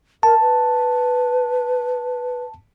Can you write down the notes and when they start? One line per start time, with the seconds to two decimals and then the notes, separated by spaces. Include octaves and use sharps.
0.23 A#4 A5
0.41 B4